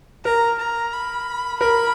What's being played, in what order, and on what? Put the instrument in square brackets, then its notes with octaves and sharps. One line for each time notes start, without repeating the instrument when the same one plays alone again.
[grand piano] A#4 [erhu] A#5
[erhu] A#5
B5
[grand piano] A#4 [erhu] B5